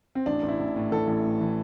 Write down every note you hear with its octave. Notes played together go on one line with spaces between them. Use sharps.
C4
A1 D4
A1
E4
A1
A2
E3 A4
A1
A2
E3